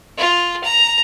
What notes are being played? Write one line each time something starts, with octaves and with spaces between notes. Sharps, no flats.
F4
A#5